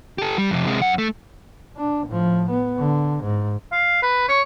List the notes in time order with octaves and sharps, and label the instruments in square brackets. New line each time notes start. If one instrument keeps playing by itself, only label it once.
[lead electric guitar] G4 A4
G3
F2 C3
C3 G#3
F#2 F#5
A3
[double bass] D4
A2 F3
B3
D3
G#2
[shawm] F5
B4
C#5